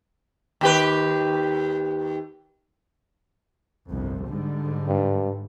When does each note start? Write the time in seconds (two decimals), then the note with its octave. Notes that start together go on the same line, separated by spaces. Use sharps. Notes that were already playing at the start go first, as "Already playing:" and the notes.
0.61 D#2 G4 B4
3.89 G1 C2 F2
4.25 G#2 D3 G3
4.88 G2